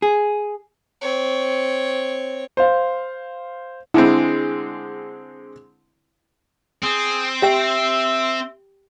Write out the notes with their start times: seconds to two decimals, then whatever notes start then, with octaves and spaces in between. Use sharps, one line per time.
0.02 G#4
1.02 C4 C#5
2.57 C5 F5
3.94 D3 G#3 C4 E4
6.84 C4 G#4
7.42 G4 E5 G5 E6